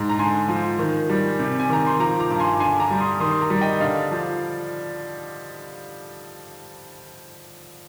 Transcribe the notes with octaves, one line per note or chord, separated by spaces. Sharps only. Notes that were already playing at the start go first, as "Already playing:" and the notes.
Already playing: G#2
A#5
D3 G#5 C6
F3
D#3
G3
C3
G#5
D#3 A#5
C6
F3 A#5 D6
A#5 D6
G2 D6
G#5 C6
D3 G#5 C6
A#5 D6
G3
C6 D#6
D#3 C6 D#6
C6
A#5 D6
G3
D#5 G5
D3 D5 F5
F3